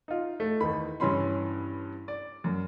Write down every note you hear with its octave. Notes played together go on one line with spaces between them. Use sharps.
D#4 F4
A3
E2 D#3 D#4 B5
G2 E3 C#4 B5 C6
D5
F#2